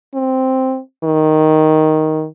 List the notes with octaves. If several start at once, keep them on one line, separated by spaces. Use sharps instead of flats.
C4
D#3